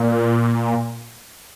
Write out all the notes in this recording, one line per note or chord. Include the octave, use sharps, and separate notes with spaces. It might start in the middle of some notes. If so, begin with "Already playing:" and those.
Already playing: A#2